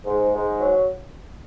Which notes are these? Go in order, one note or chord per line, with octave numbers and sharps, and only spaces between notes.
G#2
G#2
F#3